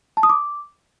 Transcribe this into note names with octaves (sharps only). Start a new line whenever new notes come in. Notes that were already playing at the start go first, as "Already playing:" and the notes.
A5
D#6
D6